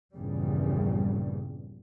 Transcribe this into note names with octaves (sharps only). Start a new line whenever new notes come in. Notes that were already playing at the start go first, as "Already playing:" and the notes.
A#1 E2 G2 A#2 C#3 G3